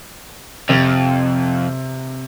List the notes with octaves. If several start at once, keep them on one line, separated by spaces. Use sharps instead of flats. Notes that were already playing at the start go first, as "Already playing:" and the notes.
F2 C3